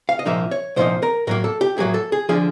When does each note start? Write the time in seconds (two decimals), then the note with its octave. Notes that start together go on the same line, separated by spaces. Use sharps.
0.09 F5
0.19 D#5
0.26 C2 A#2 F3 A#3 D#4 E5
0.51 C#5
0.76 C2 A#2 F3 A#3 D#4 C5
1.03 A#4
1.27 A2 F#3 A#3 A#4
1.44 A4
1.61 G4
1.78 A2 F#3 A#3 G#4
1.94 A4
2.12 G#4
2.29 D3 F3 G#4